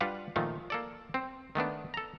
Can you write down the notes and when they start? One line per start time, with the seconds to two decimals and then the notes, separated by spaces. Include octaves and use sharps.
0.01 G3 D4 F4 B4 F5 F#5
0.36 A#2 D#3 F3 A3
0.70 A#3 A4 D5
1.14 C4
1.55 D#3 A3 B3 D4
1.94 A4 A#5